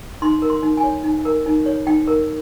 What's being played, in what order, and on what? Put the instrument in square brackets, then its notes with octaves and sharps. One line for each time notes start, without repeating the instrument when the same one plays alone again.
[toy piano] D#4 C6
A#4
C6
D#4
G#5
C#5
D#4
A#4
D#4
C#5
D#4 G5
A#4